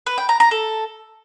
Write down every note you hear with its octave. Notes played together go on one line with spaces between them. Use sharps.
B4
G5
A#5
A#5
A4